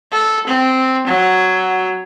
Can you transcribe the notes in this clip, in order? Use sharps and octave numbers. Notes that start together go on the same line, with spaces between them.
A4
C4
F#3